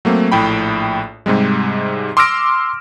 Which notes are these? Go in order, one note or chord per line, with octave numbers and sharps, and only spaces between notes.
F#3 A3 A#3 C4
A#1 A2 G5 B5
G#2 C3 G3 G#3
C6 D6 E6 F6 A#6 D7